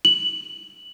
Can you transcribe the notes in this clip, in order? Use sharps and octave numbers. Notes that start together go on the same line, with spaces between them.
F#7